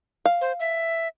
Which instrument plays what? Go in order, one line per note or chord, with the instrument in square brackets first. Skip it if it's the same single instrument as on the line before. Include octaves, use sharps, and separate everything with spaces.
[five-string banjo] F5
[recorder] C5
E5